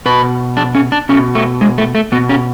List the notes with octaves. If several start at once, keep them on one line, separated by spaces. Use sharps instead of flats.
B2 B4
D4
C#4
D4
B2 C#4
A3
G#3
A3
A3
B2 B3
C#4